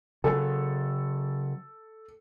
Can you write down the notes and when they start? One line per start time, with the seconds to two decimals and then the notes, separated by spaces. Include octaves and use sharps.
0.24 C#3 F#3 A4